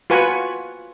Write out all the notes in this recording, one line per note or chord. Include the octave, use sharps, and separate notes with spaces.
F4 F#4 B4 G#5 B5 C#6